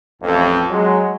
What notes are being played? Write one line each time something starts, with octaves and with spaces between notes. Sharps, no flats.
A1 F2
F#3 G#3